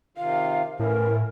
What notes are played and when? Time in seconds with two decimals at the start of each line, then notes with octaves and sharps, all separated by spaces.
0.17 C3 D#3 F4 F5
0.80 A2 E3 C#4 A#4